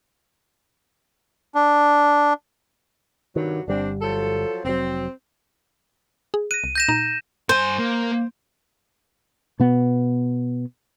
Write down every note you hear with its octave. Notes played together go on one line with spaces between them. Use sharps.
D4
G2 C3 D#3 F#3
G1 G3 C4 D4
F3 F#3 A4
F1 F#3 C4
G#4
F#6 A#6 D#7
C2
G6 A#6 E7
A#2 D#4 A#5
G2 C5 G#5
A#3
B2 B3